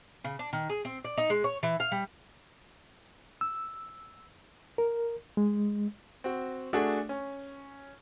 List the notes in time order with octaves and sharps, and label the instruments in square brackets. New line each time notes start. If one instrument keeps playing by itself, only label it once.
[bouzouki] C#3
D4
D#3
G#4
C4
D5
D#4
G#3
C#5
E3
F5
G3
[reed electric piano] E6
A#4
G#3
[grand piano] C4 F#4
A3 D4 F#4 G#4 A4
C#4